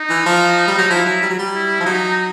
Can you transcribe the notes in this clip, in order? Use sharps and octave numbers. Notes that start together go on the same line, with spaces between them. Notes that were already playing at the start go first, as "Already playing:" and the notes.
Already playing: D#4
E3
F3
G3
F#3
F3 E4
F#3
G3
F#3
G3
E4
F3
F#3 D#4